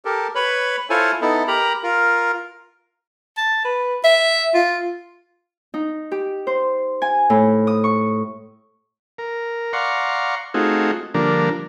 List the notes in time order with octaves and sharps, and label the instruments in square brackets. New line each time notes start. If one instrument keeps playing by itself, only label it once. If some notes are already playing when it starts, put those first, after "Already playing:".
[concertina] G4 A4 A#4
B4 C#5 B5
E4 F4 A4 C5 C#5 G#5
B3 D#4 E4 A4
G4 A#4 A#5 B5
F4 A#4
[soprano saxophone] A5
B4
E5
F4
[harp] D#4
G4
C5
G#5
A2
D#6
C#6
[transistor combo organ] A#4
D5 F5 F#5 A#5 C6 C#6
A3 C4 D#4 F4 F#4 G#4
D3 F3 G3 A#3 D4 A#4